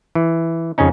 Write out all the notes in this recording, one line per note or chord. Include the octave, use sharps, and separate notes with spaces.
E3
F2 C#3 F3 C#4 D#4